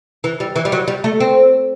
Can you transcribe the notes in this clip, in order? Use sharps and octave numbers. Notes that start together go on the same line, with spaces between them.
E3
G3
E3
G3
F#3
G3
A3
C4